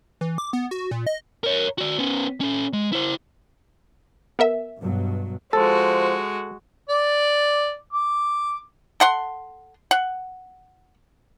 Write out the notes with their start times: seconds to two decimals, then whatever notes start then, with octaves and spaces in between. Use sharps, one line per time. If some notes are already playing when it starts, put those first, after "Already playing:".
0.21 E3
0.38 D6
0.53 B3
0.71 F#4
0.91 A#2
1.07 D#5
1.44 A#4 C#5
1.78 F#4 D5
1.99 B3 C#4
2.41 C#4 A4
2.73 G#3
2.93 E4 C5
4.39 B3 A#4 E5
4.80 G2 B2 F#3
5.53 F3 G#3 F#4 A4 C5
6.89 D5
7.93 D6
9.00 A4 F#5 C6
9.91 F#5